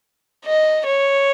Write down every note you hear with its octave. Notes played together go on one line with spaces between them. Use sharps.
D#5
C#5